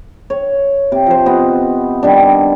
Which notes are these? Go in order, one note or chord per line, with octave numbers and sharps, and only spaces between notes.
C#5
C3
F3 C5
C3 B3 D#5
D#3 G3 D4